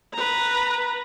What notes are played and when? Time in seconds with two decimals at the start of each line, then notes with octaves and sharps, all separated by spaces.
0.14 B4 A#5